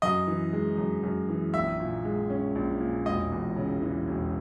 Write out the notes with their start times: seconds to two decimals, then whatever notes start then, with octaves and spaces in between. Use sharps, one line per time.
0.02 F#2 D#5
0.27 E3
0.53 G#3
0.78 F#2
1.03 F#2
1.29 E3
1.54 A#1 E5
1.80 A#2
2.05 G#3
2.30 C#4
2.55 A#1
2.80 A#2
3.06 E1 D#5
3.32 E2
3.56 C#3
3.82 E3
4.08 E1